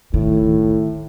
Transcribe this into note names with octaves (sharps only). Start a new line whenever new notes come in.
A2 D#3